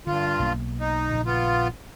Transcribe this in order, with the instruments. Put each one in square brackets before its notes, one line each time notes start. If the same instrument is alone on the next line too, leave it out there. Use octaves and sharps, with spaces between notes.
[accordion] G2 F4 [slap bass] D3
[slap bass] B1 A#3
[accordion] D#4
[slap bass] A#1 A#2 C#3
[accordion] B3 F4